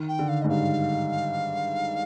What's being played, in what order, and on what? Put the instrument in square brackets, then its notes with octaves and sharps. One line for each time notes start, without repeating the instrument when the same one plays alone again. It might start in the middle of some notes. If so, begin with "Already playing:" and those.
Already playing: [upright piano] D#3
[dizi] G5
[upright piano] D3
[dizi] F5
[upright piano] G#2 [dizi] D#5
[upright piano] G2 [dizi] F5